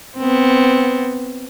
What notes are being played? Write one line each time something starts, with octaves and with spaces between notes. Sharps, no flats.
B3 C4